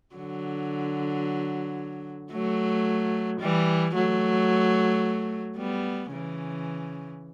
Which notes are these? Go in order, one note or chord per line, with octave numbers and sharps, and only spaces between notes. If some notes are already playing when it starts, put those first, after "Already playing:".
D3 F#3
F#3 A3
E3 G3
F#3 A3
G3 B3
C#3 E3